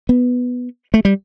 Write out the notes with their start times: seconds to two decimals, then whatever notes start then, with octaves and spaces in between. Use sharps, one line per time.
0.09 B3
0.94 A3
1.05 G3